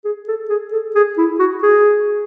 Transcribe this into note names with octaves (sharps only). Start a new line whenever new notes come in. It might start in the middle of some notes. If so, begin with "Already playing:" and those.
G#4
A4
G#4
A4
G#4
E4
F#4
G#4